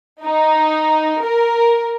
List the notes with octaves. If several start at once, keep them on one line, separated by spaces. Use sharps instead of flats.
D#4
A#4